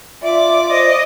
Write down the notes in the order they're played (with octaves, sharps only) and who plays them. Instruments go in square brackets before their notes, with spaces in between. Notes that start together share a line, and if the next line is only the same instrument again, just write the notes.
[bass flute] F4 [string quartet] D5 D6 [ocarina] E5
[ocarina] C5 [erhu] D#5